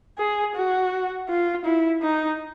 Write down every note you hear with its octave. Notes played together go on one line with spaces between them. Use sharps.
G#4
F#4
F4
E4
D#4